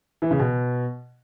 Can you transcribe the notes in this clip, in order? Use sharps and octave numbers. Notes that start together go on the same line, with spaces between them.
E3
C#3
B2